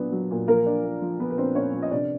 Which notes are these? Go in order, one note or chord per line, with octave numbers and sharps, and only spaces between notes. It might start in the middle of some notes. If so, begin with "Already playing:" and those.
Already playing: A#2 F#3 B3 D4
F#3
A#2
F3 A#3 A#4
D4
A#3
F3
F3 B3 B4
B4
C4 D4 C5
A#3 C#4 C#5
F3
D#5
C3 D4 D5